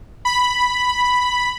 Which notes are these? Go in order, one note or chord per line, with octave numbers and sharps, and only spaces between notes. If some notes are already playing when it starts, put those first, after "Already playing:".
B5